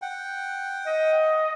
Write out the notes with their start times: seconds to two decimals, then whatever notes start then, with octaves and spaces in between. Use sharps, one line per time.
0.02 F#5 G5
0.86 D#5